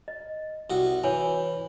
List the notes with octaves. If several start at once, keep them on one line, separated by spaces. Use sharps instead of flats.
D#5
C2 F#4
E3 C#5 G#5